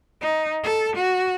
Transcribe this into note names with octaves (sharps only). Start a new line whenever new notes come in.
D#4
A4
F#4